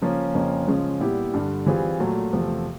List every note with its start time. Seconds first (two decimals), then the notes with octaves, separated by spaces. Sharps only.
0.02 C#3 F3 A#3 C#4
0.34 F2 C#3 F3 A#3 C#4
0.67 C#3 F3 G#3 C#4
1.00 A#2 G3 B3 E4 G4
1.34 G2 D3 G3
1.66 E3 G3 C4 F4 G#4
2.00 A#2 F#3 A3
2.32 E2 C3 F3 A3